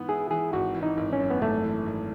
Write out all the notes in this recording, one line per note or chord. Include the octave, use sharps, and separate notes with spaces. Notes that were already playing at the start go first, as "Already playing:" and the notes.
Already playing: G#2 E3 B3
E4 G#4
E3 G#4
G#1 F#4
E3
D#4
G#1
C#4
F#2
B3
G#1 A3
E3
G#1